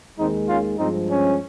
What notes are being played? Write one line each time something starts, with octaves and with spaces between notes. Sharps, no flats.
D#2 D#3 G#3 C4 D#4
C#4 F4
G2 F3 G#3 C4 D#4
C#4